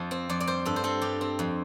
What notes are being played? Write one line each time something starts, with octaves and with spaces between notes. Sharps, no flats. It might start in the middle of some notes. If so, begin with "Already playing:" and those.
Already playing: F2 F3
C4
F2 D5
D5
G3 C5
G2 A4
C5
C4 A4
G2 G4
C4
F2